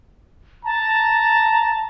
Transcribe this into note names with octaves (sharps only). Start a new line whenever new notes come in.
A5 A#5